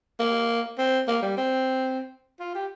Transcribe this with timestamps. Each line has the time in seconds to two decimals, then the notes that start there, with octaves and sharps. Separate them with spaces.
0.20 A#3
0.78 C4
1.08 A#3
1.22 G3
1.37 C4
2.40 F4
2.55 G4